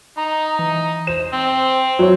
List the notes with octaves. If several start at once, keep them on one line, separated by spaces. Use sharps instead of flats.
D#4 A#5
E3
C5 E7
C4
F#3 C#5